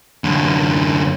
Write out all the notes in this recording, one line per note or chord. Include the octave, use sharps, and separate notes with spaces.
F#2 D3